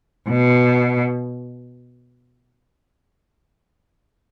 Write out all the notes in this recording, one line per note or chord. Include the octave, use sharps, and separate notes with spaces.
B2